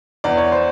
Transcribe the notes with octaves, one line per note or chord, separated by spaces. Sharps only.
E2 D5
C#5
C5